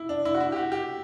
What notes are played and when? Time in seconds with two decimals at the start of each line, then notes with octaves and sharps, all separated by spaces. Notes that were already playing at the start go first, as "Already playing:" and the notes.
Already playing: E4
0.09 D4
0.25 E4
0.34 F#4
0.40 E4
0.52 G4
0.56 F#4
0.72 G4